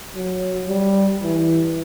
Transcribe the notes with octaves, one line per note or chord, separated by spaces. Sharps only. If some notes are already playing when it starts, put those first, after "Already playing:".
F#3
G3
E3